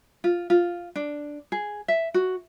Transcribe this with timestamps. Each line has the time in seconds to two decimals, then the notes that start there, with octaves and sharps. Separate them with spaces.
0.24 F4
0.50 F4
0.96 D4
1.52 G#4
1.88 E5
2.14 F#4